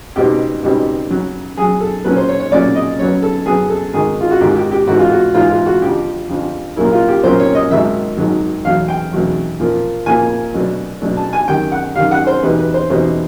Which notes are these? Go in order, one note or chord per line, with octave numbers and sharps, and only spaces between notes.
C#2 B2 G3 C4 D#4 G4
C#2 B2 G3 C4 D#4
F#2 C#3 F#3
F#2 C#3 F#3 G#4
A4
A#2 F#3 A3 C#4 B4
C5
C#5
C#5
A#2 F#3 A3 C#4 D5
D#5
F#2 C#3 F#3 B3 C#5
A4
F#2 C#3 F#3 B3 G#4
A4
G#1 G#2 D#3 G#4
F4
F#4
G#1 G#2 D#3 G4
G4
G4
A1 G#2 E3 F#4
F4
F#4
A1 G#2 E3 F4
F4
F#4
F2 D3 F3 G4
F2 D3 F3
C2 A#2 F#3 A#3 C#4 E4
F4
G4
C2 A#2 F#3 A#3 C#4 C5
C#5
D#5
G#1 G#2 D#3 F#3 E5
G#1 G#2 D#3 F#3
E2 B2 F#3 A3 F5
G5
E2 B2 F#3 A3
A#2 F3 A#3
A#2 F3 A#3 G#5
B2 F#3 A3 D4
B2 F#3 A3 D4
A5
G#5
F#2 D#3 G3 G5
F#5
F#2 D#3 G3 F5
F#5
C5
E2 B2 G3 B3 D#4 B4
B4
C5
E2 B2 G3 B3 D#4 C5